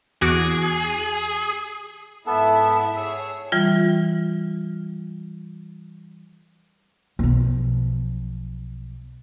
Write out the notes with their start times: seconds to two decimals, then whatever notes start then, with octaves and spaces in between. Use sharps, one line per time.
0.22 E2 F#4 G#4 D6
2.27 G#2 B3 E4 A4 E5
2.96 G#4 C#5 E6
3.52 E3 G3 F4
7.19 B1 F3